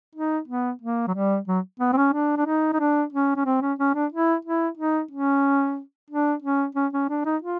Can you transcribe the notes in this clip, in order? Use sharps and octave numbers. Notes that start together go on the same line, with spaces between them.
D#4
B3
A#3
F#3
G3
F#3
B3
C4
C#4
D4
D4
D#4
D#4
D4
C#4
C#4
C4
C#4
C#4
D4
E4
E4
D#4
C#4
D4
C#4
C#4
C#4
D4
D#4
F4